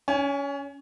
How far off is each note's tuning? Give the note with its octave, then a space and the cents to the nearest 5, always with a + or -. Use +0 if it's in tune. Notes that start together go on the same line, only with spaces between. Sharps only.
C#4 +25 G#5 -15